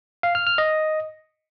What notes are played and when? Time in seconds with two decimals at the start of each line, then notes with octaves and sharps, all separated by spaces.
0.23 F5
0.35 F6
0.47 F6
0.58 D#5